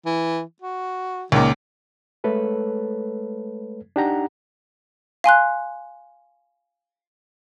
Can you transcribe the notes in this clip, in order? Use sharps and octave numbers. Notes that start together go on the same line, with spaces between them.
E3
F#4
C#2 A#2 D#3
G#3 A3 A4 B4 C#5
D4 D#4 G4 F#5 A#5
F5 G#5 C6 F#6